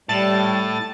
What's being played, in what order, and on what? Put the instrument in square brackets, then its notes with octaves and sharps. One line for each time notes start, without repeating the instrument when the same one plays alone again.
[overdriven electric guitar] A2 [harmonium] G3 [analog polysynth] A5 A6